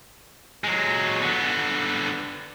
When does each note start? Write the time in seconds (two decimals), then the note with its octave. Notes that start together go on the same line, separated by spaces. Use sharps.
0.64 F#3 G#3
1.22 D3 B3